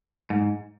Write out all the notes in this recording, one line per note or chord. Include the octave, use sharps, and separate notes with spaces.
G#2